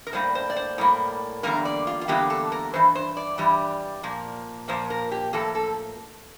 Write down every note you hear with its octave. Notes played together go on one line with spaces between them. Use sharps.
A#4
A2 G3 A#3 C5
C5
D5
C5
A2 G3 A#3
E2 D3 G3 A#3 A#4
D5
F4
F4
E2 D3 G3 A#3 G4
A4
A#4
G2 E3 C5
C5
D5
G2 E3 G3
A#2 F3 A#3
A#2 F3 A#3 C5
A#4
G4
A2 F3 A#3 A4
A4